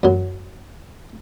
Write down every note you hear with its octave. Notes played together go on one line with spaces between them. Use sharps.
F#2 F#3